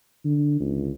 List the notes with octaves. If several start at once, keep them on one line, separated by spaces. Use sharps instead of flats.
D3
C#2